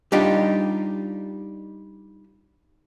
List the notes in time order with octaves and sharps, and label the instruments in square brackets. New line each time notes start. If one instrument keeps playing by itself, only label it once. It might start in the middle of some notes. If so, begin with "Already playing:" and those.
[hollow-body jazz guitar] G3 D4 D#4 F4 G4